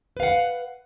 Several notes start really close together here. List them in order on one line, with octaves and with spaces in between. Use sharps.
B4 F5 F#5